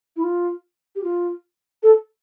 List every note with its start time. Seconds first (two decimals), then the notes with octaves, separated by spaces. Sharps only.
0.16 E4
0.23 F4
0.95 G4
1.03 F4
1.83 A4